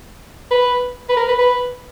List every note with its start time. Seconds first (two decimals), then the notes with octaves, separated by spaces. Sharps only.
0.51 B4
1.09 B4
1.17 A#4
1.28 B4
1.38 B4